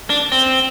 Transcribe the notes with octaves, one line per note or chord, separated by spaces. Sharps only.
D4
C4